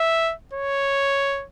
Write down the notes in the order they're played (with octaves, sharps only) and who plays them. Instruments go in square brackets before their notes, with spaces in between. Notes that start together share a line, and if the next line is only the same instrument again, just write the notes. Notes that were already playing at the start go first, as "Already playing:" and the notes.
Already playing: [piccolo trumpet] E5
C#5